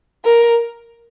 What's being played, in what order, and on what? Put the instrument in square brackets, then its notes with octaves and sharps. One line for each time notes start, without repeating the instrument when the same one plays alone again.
[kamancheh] A#4